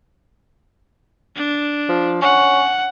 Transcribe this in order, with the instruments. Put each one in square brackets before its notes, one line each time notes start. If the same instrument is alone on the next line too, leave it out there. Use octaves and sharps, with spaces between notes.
[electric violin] D4
[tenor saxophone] F3
[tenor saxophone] C#4 [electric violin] F#5